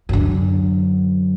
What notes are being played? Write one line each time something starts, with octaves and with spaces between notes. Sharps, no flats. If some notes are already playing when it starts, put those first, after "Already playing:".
F#2 D3